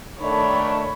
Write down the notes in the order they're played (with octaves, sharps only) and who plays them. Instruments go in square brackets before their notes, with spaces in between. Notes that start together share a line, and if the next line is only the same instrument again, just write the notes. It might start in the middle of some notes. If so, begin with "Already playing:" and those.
[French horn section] D#3 A3 D4 [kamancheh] C#5 B5